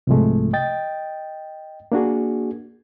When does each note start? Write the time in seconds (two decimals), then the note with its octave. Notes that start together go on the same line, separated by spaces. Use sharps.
0.07 C2 G#2 C3 F3 G#3 A3
0.53 D#5 G5 A6
1.92 A#3 D4 F#4 G#4